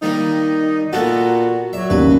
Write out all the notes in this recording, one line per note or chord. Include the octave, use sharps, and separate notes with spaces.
D#3 G3 A#3 D#4
A#2 A#3 B3 F#4 A4
F#3 D5 E5
A1 D#2 C#3 B4